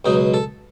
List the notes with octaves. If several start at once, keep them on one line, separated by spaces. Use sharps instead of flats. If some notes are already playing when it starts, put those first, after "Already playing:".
C#2 B2 F#3 D#4
A4